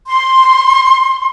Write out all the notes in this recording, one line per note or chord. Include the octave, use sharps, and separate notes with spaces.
C6